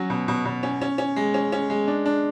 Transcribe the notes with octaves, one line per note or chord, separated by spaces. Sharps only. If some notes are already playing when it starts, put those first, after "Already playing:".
Already playing: F#3 C#4 F#4
B2
B2
B2
C#4
C#4
C#4
G#3
C#4
C#4
G#3
D4
D4